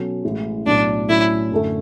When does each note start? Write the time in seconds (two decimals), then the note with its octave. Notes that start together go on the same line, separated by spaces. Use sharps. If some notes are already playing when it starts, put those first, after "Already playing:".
Already playing: B2 F#3 C#4 F#4 A4
0.23 A1 A2 E3 G#3
0.66 B1 A2 F#3 D4
1.08 A2 F#3 C#4 E4
1.51 F#2 D3 A3